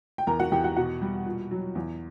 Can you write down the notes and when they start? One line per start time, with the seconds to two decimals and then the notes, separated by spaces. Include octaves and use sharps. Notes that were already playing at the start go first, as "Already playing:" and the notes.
0.18 G5
0.27 E2 A#4 A#5
0.39 F#4 F#5
0.52 E2 G4 G5
0.64 F#4 F#5
0.76 B2 F#4 F#5
1.01 G3
1.26 A#2
1.51 F#3
1.75 E2